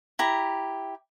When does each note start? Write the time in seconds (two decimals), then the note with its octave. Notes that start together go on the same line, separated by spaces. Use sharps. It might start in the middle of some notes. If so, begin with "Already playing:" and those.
0.19 E4 G4 A#5